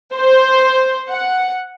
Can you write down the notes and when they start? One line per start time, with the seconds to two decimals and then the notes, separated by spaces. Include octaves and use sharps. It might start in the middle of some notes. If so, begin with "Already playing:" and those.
0.14 C5
1.11 F#5